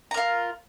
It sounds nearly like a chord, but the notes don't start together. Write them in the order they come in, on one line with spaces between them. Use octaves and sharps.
A#5 A#4 F4